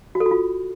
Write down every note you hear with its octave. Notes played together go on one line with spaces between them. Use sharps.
F#4
A4
F#4
F4